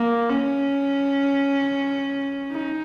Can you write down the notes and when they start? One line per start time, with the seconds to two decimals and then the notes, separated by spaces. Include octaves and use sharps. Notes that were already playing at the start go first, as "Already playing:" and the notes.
Already playing: A#3
0.30 C#4
2.51 D#4